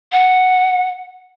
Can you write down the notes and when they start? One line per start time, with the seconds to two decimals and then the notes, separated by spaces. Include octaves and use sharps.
0.12 F#5